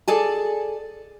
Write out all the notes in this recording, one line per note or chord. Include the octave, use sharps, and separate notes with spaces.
G#4 A4 D5 G#5 A5